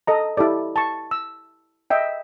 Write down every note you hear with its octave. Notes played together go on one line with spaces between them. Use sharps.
A4 D#5 A#5
E4 G4 A4 D5
A5 C#6
E6
D#5 E5 G5